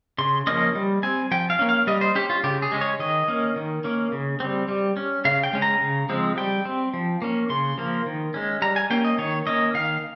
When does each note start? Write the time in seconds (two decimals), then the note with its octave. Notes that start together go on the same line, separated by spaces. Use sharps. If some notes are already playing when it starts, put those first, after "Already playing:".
0.18 C#3 C6
0.47 F3 A#3 C#4 D#5
0.75 G3
1.03 C4 G#5
1.31 F3 G5
1.50 F5
1.59 A#3 C#4
1.69 F5
1.87 G3 D#5
2.01 C5
2.15 C#4 G4
2.30 F4
2.44 C#3 G4
2.62 G#4
2.72 G#3 C#4
2.81 C#5
2.99 D#3 D#5
3.28 A#3 C#4
3.56 D#3
3.84 A#3 C#4
4.12 C#3
4.40 G3 C4
4.68 G3
4.97 C#4
5.25 C#3 F5
5.43 G5
5.53 G#3 C#4
5.62 A#5
5.81 C#3
6.09 F3 G#3 C4
6.37 G3 G5
6.65 C4
6.94 F3
7.22 A#3 C#4
7.50 C#3 C6
7.78 F3 A#3
8.06 D#3
8.34 G#3 C#4
8.62 G3 A#5
8.76 G#5
8.90 A#3 C#4 G5
9.05 D#5
9.18 D#3 C#5
9.47 A#3 C#4 D#5
9.74 D#3 F5